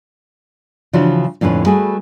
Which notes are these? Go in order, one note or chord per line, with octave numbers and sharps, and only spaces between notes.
C#3 E3 F3 D4 F#4 C5
F2 A2 D3 C#4 B4
G3 A3 F#4 G#4 A4 B4